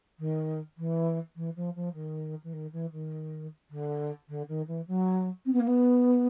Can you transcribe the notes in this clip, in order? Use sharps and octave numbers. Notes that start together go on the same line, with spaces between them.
D#3
E3
E3
F3
F3
D#3
E3
D#3
E3
D#3
D3
D3
D#3
E3
F#3
C4
B3
A#3
B3